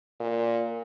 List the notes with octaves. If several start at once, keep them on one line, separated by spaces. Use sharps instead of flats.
A#2